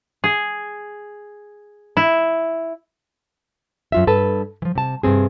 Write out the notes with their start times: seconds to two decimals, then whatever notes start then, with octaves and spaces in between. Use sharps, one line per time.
0.24 G#4
1.97 E4
3.92 F#2 F4 E5
4.07 G2 A4 B4 A5
4.62 E3 F3
4.75 C3 A5
5.03 G2 C3 C4 G#4